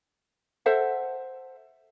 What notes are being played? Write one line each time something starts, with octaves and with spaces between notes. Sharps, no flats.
A4 C5 E5 F#5